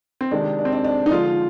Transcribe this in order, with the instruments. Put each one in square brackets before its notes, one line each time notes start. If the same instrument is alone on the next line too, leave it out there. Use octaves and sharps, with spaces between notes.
[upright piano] C4
C3 D#3 G#3 D4
D4
C4
D4
D4
D#4
D3 F3 G#3 F4